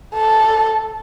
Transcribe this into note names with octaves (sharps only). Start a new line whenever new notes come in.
A4